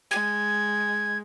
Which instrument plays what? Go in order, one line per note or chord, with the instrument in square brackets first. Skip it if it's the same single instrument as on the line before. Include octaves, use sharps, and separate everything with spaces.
[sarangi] G#3 [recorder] G#6